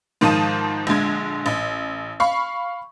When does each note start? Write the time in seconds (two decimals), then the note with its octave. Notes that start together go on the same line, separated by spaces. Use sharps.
0.21 G#2 D#3 F3 A5 D#6 D#7
0.87 A#1 D3 G#3 G#6
1.46 A1
2.20 F5 B5 C#6